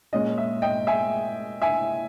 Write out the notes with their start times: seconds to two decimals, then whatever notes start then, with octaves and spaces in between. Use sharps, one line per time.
0.13 A#2 G#3 C#4 D#5
0.38 E5
0.62 D#5 G5
0.87 E5 G#5
1.62 E5 G#5